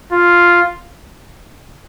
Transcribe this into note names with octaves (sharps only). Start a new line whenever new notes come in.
F4